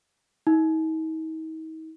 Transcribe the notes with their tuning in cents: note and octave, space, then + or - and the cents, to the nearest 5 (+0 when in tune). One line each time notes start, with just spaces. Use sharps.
D#4 +40